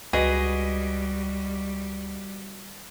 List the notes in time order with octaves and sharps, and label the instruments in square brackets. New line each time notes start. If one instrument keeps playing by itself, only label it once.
[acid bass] C#2 [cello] G3 [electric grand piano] F#4 B4 D#5 [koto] G#4